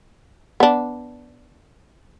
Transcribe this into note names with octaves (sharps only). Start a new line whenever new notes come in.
B3 D4